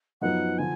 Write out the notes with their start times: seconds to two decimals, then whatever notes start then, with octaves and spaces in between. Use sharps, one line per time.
0.21 F#2 F3 B3 D#4 F#5
0.58 D3 F3 G#5